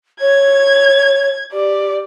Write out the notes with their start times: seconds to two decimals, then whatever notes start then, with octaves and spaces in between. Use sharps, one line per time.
0.21 C#5 G#6
1.53 G4 D5